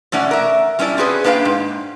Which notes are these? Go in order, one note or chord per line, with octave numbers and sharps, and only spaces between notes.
B2 A3 C#4 D5 F#5
A#4 E5
G3 C#4 D4 E4 D5
C4 C#4 F#4 G#4 B4
A#3 D4 B4 F5 G5
G#2